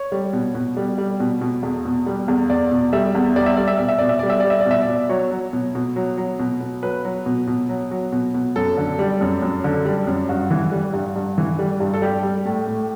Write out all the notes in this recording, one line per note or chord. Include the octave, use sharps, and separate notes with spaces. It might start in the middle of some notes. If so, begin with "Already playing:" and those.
Already playing: C#5
G3
B2
B2
G3
G3
B2
B2
E2
B2
G3
E2
E2 D5
B2
G3 E5
E2
G3 D5
E5
G3 D5
E5
B2 D5
E5
B2 D5
E5
G3 D5
E5
G3 D5
E5
D5
B2 E5
D5
B2
F#3 C#5
F#3
B2
B2
F#3
F#3
B2
B2
F#3 B4
F#3
B2
B2
F#3
F#3
B2
B2
F#2 A4
D3
G3
F#2
F#2
D3
G3
F#2
G2 F#4
E3
G3
G2
G2
E3
G3
G2
A4
G3 G4
G3
A2
A2